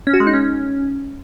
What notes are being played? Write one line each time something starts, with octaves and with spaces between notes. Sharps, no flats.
C#4
F#4
G#3
D#4
C#4